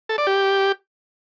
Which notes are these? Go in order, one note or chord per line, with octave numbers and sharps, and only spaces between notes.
A4
D5
G4